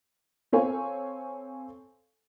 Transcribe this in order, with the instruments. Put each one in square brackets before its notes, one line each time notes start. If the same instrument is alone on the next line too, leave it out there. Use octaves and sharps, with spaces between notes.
[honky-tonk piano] C4 A4 C5 C#5 F5 G#5